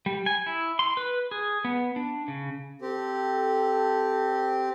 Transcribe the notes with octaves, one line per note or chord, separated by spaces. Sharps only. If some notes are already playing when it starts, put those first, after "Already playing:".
G3
G#5
E4
C6
B4
G#4
B3
D4
C#3
C4 G4 A4